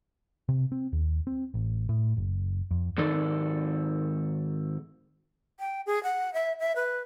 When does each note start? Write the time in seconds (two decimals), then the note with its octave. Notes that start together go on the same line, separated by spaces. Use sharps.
0.49 C3
0.72 C4
0.93 D#2
1.27 C4
1.54 A1
1.89 A2
2.17 F#1
2.71 F2
2.98 G#2 D#3 A4 D5
5.60 G5
5.86 G#4
6.03 F#5
6.34 E5
6.60 E5
6.76 B4